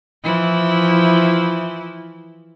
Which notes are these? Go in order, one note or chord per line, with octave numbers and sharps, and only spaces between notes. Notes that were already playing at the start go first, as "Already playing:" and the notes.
E3 F3 E4